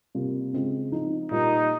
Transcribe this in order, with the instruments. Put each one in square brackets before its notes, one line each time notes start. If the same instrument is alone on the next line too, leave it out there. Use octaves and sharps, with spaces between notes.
[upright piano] C3 G3 A#3 F4
C#3 G#3 C4 F4
F3 C4 D#4
[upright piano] A#2 G3 A#3 F4 [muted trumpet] D#4